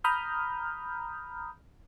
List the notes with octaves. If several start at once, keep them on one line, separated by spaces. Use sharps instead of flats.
A#5 B5 D#6 F6 G6